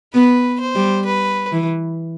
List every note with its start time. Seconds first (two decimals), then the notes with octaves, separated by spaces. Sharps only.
0.14 B3 B4
0.61 C5
0.75 G3
1.06 B4
1.53 E3